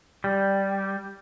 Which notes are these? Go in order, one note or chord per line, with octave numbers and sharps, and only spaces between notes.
G3